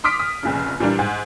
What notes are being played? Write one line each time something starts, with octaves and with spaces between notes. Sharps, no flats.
C6 D6 D#6 F6 B6 D7
D#6
F1 A#1 C#3
A#2 E3 G3 A#3 D4
G#2